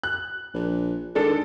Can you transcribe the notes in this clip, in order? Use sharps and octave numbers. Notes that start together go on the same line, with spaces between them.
F#6
A#1
D#3 G#3 D4 A4